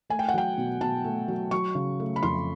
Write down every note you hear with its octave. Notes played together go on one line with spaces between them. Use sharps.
A3 G#5
G5
F#5
F#3 G5
B2
B2 A5
A3
F#3
F#3 C#6
C#3
A3
B5
F2 C6